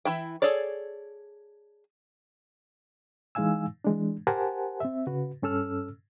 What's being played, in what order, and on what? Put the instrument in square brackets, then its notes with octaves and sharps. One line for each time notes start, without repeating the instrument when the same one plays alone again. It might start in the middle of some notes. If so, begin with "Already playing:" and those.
[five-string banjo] E3 E4 G5
G#4 A4 C#5 D5
[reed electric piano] E3 G#3 D#4 F5 G#5 E6
E3 G#3 D4
G4 A#4 C5 F#5 G#5 A5
C4 E5
C#3 F#4 B4
G2 C#4 A4 E6 F6